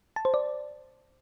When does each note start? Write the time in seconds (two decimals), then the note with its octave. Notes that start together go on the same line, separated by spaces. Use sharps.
0.16 A5
0.25 C5
0.34 D5